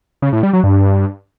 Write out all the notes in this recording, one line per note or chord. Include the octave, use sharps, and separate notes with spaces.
C#3
A2
G3
F#3
G2